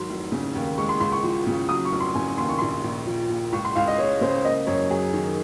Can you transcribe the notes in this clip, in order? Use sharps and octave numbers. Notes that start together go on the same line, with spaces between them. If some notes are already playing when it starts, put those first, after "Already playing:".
Already playing: G#2 D#3 F#3 C6
F1
C#3
D#2
G#3 C#6
C6
C#2 C6
C#6
F3
C#3
F#3 D#6
C#6
F1
C6
C#3 G#5
D#2 C6
C#6
A#1 C6
A#1
F3
A#2
C#2 C#6
C6
C#2 F5
D#5
G#3 C#5
C#3 C5
A#3 D#5
F#2 C#5
F#3 G#4
D#3